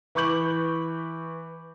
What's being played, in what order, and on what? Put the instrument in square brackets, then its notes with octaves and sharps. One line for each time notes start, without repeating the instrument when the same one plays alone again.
[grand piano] E3 B5 C#6 D6 G6 F#7